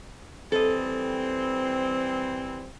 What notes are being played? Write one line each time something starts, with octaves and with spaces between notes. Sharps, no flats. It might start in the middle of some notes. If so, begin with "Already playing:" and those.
E3 G3 C4 A4 D#5